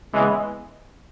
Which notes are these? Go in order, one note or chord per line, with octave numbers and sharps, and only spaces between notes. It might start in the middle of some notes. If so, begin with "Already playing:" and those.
C#3 E3 G#3 B3 E4